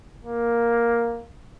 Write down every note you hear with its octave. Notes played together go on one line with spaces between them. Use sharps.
A#3